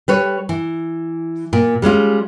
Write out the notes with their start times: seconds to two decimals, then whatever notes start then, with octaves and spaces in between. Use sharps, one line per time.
0.08 G3 B4 C#5
0.49 E3
1.53 A#2
1.82 G3 G#3 C#4 F4